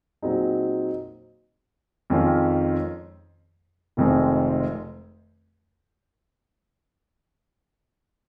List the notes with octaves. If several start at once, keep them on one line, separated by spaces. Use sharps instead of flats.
A#2 F#3 C4 D#4 G#4
F2 D#3 G#3 C#4 F4
F1 F2 D#3 G#3 C4